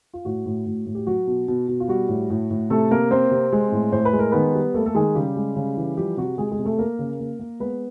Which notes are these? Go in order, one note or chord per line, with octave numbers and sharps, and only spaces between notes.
F4
A2 F#4
A2
A2
A2
G4
F#3 F#4
B2
B2
B2
F4
G3 F#4
A2
A2
A2
C3 A3 A4
C3 A#3 A#4
A#3 C4 C5
C3
G#3
A2
A2 C5
B4
G#3
A#4
D#3 B3 B4
G3
A3 A#3 A4
A4
D#3 G#3 G#4
C#3 G3 G4
G#3
C#3
E3
F3 G3 G4
C3 F#4
C3 G#3 G#4
G#3 G#4
C3
A3 A4
A#3 A#4
C#3
A#3
A#3
G#3 B3 B4